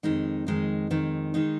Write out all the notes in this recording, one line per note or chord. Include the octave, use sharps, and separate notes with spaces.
F2 D#3 G#3 D#4
F2 D#3 G#3 D#4
F2 D#3 G#3 D#4
D#3 G#3 D#4